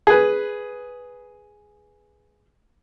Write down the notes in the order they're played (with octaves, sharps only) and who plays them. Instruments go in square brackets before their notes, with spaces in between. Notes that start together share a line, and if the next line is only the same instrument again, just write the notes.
[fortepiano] G#4 B4